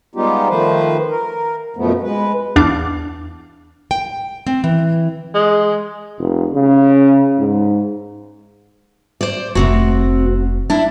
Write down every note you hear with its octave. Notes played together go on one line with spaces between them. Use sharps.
G3 G#3 B3 D#4 F4 G4
D#3 F3 A3 B4 C5
A#4
F#2 B2 F3 A3 B3
G#3 B4
E2 D4 F5 D6
G5
C4
E3
G#3
F1
C#3
G#2
C5 D5
F1 C3 A3 C4 F#4
D4 E4